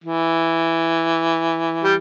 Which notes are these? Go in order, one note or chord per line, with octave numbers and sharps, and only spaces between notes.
E3
G3